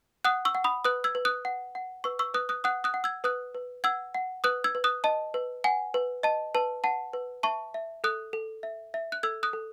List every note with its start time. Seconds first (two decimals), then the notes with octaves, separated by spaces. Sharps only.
0.24 F#5 D#6 F#6
0.45 C#6 E6
0.55 F#5
0.64 B5 D#6
0.84 B4 D#6 F#6
1.04 E6 G#6
1.15 B4
1.25 D#6 F#6
1.45 F#5
1.75 F#5
2.04 B4 C#6 E6
2.19 C#6 E6
2.34 B4 D#6 F#6
2.49 D#6 F#6
2.64 F#5 D#6 F#6
2.84 D#6 F#6
2.94 F#5
3.04 E6 G#6
3.24 B4 D#6 F#6
3.55 B4
3.84 F#5 E6 G#6
4.14 F#5
4.44 B4 D#6 F#6
4.64 E6 G#6
4.75 B4
4.84 D#6 F#6
5.04 D#5 A5
5.34 B4
5.64 F#5 G#5
5.94 B4
6.23 D#5 A5
6.55 B4 A5
6.84 F#5 A5
7.13 B4
7.43 E5 A5 C#6
7.74 E5
8.04 A4 D#6 F#6
8.33 A4
8.63 E5
8.94 E5
9.12 F#6
9.23 A4 E6 G#6
9.43 D#6 F#6
9.53 A4